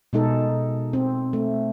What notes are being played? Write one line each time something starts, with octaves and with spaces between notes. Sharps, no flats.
B2 G#3 D#4 A4
C4
A3